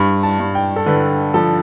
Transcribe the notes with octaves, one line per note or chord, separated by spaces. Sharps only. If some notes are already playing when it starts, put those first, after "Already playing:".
Already playing: G2 B5
A5
G2
G5
A4
D3 B4
F3 A4